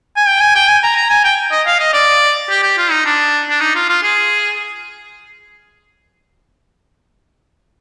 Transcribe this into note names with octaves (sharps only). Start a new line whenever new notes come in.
G#5
G5
G#5
G5
G#5
A#5
A#5
G#5
G5
D#5
F5
D#5
D5
G4
G4
F4
D#4
D4
D4
D#4
F4
F4
G#4